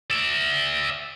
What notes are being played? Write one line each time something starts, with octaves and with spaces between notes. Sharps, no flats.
D5 E5